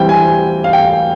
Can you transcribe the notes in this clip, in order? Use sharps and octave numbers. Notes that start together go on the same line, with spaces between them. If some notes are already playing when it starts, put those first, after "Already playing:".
Already playing: E3 G3 C4 G5
G#5
F5
G5